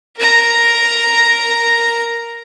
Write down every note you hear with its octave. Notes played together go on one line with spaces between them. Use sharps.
A#4 A#5